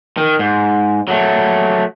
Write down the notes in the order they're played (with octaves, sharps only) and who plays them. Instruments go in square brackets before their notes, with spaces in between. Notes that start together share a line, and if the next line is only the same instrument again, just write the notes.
[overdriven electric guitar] D#3
G#2
F#3 A3